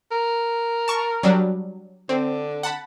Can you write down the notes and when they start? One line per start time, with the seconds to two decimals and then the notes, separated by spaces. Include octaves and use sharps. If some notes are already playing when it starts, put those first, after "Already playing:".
0.11 A#4
0.88 A5 C#6
1.23 F#3 G3 D4
2.09 D3 C4
2.63 F#5 A5 B5